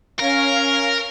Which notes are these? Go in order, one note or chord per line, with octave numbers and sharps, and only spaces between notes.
C#4 A#4 F5